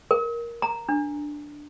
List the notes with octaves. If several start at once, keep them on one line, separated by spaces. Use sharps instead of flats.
A#4
A#5
D4